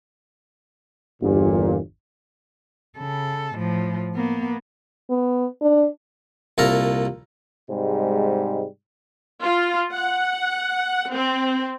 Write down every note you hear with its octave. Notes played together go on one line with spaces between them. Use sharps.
G1 E2 G2 A#2
C#3 A4
A2 F3
A#3 B3
B3
D4
C2 A#2 A4 A#4 A#5
G#2 C3 G3 G#3
F4
F#5
C4